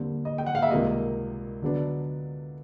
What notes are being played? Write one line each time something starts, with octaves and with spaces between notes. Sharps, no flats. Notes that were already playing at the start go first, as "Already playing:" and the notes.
Already playing: D#2 D3 G3 C4
D#5
G5
F#5
F5
E5
C#2 C3 D#3 G3 A#3 D#5
D3 F#3 B3 D4